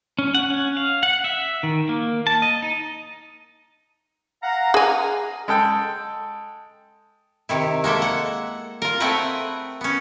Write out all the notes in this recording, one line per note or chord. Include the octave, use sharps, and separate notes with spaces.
C#4
F#5
C#4
F5
F#5
E5
D#3
A#3
A5
D#5
D#4
F5 F#5 A#5
G#4 G#5
G#3 A4 G5
C3 D#3 E4
G#3 A#3 A4 E5
F#5
F4 A#4
A3 C4 G#4 A#4 B4 F#5
B3 C#4